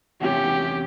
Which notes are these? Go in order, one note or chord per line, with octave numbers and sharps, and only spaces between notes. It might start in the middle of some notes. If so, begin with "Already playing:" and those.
E2 C3 C#4 G4